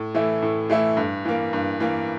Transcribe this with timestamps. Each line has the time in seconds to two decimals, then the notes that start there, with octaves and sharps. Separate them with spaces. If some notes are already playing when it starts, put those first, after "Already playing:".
Already playing: A2
0.15 E3 A3 E4
0.42 A2
0.70 E3 A3 E4
0.97 G2
1.25 E3 A#3
1.53 G2
1.80 E3 A#3